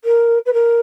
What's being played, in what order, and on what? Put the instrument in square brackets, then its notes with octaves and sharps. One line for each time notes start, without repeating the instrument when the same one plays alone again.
[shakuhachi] A#4
B4
A#4